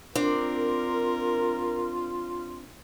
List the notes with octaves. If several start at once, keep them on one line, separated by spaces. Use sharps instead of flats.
C4 D4 F4 A#4